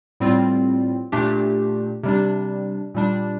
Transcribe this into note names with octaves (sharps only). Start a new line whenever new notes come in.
A2 G3 C4 F4
A#2 A3 D4 G4
C3 G3 D4
A#2 G3 D4